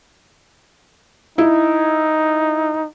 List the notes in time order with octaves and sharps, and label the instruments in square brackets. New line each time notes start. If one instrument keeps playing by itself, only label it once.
[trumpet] D#4 [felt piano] E4